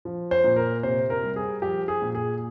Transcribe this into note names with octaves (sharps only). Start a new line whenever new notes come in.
F3
C5
A#2
A#4
C3 C5
A#4
G3
G#4
F3 G4
G#4
A#2
G#4